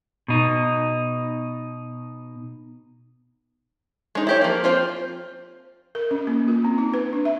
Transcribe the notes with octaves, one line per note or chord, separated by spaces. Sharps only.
B2 D#4
G#3 D#4
E4 G4 C#5
F3 A#3
C4 F4 C5
A#4
C#4
A#3
F4
C4
D#4
B4
D4
E5